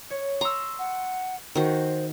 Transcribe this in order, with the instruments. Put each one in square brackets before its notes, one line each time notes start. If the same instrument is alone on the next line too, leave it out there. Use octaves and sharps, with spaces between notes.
[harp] C#5
[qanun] A#5 [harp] C6 C#6 E6
[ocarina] F#5
[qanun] D#3 F#4 [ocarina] C5